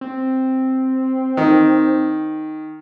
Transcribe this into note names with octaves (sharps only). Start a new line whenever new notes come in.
C4
D#3